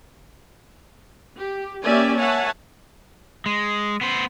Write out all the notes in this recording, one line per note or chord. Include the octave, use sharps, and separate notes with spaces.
G4
A#3 C#4 G4 D5 E5 G#5
C#5 E5 F#5 G#5 A5
G#3
B3 C5